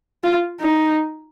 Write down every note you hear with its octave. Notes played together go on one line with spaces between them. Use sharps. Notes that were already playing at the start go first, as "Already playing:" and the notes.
F4
D#4